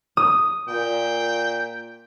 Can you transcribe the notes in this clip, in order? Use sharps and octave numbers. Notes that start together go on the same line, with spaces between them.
D#6
A#2 G5